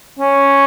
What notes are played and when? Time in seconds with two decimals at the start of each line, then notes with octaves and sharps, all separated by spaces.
0.19 C#4